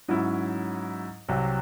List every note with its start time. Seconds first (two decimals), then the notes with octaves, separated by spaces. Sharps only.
0.08 G#2 F#3 C#4 E4
1.29 C2 C3 F#3